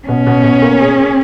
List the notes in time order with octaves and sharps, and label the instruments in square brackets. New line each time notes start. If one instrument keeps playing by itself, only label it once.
[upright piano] B2 [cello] C#4
[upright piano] B2
B2
A#3
G#4
G#4